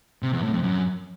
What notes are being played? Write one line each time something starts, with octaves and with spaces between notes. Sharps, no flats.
C3
E2
A2
F2
F#2